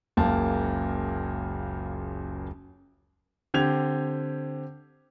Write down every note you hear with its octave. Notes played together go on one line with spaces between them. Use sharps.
F#1 C#2 A#3 A5
D3 C4 G4 G6 G#6 F7